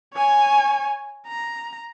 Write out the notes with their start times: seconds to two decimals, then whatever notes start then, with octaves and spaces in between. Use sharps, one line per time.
0.14 C#5 G#5
1.27 A#5